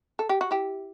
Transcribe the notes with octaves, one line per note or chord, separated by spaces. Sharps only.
A4
G4
F#4
E4 G4